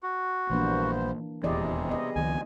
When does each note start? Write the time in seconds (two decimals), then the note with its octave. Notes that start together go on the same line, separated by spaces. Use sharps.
0.03 F#4
0.50 A#1 G2 E3 A#3 B3 D4 C5
1.44 D#1 E2 C3 E3 G3 G#4 D5 D#5
1.89 B3 D#5
2.16 C#2 D#3 F3 G#5